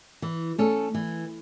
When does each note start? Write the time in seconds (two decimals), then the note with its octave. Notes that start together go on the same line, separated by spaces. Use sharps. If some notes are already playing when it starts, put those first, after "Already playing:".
0.22 E3
0.58 A3 C#4 A4
0.95 E3